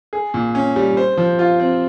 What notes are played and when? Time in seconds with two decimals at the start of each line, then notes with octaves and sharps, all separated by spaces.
0.13 G#4
0.34 A#2
0.55 C#4
0.76 G3
0.97 C5
1.17 F3
1.39 F4
1.60 C4